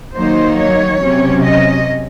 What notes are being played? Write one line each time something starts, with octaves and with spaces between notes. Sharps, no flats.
D#3 F#3 A#3 D#4 C5
C#5
C3 F#3 C#4
D#5